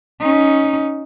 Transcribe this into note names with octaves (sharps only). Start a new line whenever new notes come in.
C#4 D#4